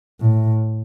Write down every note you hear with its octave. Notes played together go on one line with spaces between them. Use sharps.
A2